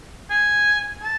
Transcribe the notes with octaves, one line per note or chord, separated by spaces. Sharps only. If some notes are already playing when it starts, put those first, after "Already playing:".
G#5
A5